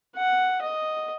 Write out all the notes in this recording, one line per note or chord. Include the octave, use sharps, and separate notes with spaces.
F#5
D#5